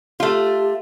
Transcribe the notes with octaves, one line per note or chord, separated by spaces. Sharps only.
A3 F4 G4